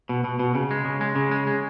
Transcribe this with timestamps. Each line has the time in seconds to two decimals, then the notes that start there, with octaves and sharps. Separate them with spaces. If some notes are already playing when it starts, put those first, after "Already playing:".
0.09 B2
0.24 B2
0.39 B2
0.55 C#3
0.71 G#3
0.85 C#3
1.01 G#3
1.16 C#3
1.31 G#3
1.47 G#3